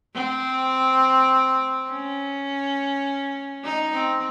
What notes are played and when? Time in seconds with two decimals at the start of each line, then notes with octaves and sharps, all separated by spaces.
0.14 C4
1.90 C#4
3.64 D#4
3.94 C4